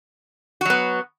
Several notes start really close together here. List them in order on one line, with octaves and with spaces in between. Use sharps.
F#4 F#3 B3